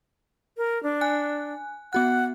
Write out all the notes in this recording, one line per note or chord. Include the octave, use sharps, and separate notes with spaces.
A#4
D4
G#5 F#6
B3 F#4 F#5 F#6